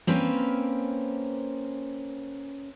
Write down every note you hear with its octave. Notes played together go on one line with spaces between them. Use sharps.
A#3 C4 C#4 B4